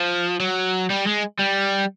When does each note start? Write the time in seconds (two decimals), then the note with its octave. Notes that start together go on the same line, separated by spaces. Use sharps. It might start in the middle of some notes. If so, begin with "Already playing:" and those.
Already playing: F3
0.40 F#3
0.90 G3
1.07 G#3
1.39 G3